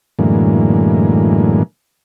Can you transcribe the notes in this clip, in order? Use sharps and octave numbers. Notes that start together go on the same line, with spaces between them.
F#2 A2 D3 E3 G#3 A#3